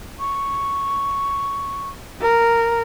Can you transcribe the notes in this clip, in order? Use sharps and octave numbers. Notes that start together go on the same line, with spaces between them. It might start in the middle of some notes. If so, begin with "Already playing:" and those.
C#6
A#4